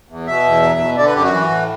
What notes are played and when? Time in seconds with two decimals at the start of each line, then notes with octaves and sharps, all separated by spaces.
0.09 E2
0.27 B2 E5
0.44 E2
0.62 F#3
0.79 B2
0.97 D3 D5
1.06 B4
1.14 F#2 G4
1.24 F#4
1.32 E3
1.50 A2